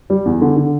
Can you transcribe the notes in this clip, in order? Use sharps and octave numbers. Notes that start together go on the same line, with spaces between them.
G3
E2
D3
D3